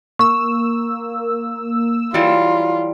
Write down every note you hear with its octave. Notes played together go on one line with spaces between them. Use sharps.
A#3 C#6 E6
E3 F#3 G3 F4